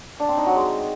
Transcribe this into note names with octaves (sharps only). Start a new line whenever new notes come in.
D4
C4
D#4
F#3
G#3